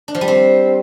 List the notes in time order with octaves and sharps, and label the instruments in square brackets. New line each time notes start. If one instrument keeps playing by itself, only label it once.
[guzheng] D4
F3
G3
C4